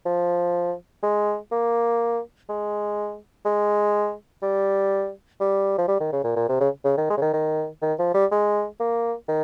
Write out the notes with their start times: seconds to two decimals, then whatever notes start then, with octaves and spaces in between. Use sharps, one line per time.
0.06 F3
1.03 G#3
1.52 A#3
2.49 G#3
3.45 G#3
4.42 G3
5.40 G3
5.78 F3
5.88 G3
6.00 D#3
6.12 C#3
6.24 A#2
6.36 A#2
6.49 C3
6.60 C#3
6.85 C#3
6.97 D#3
7.10 G#3
7.17 C#3
7.21 D#3
7.33 D#3
7.82 D#3
7.99 F3
8.14 G3
8.32 G#3
8.80 A#3
9.28 D#3